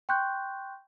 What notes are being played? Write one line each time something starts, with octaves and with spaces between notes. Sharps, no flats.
G5 C6 C#6 F#6 G6